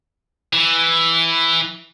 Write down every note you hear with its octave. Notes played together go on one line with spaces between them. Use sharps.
E3